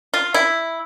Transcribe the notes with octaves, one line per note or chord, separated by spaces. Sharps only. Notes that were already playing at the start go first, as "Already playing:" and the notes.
F4
E4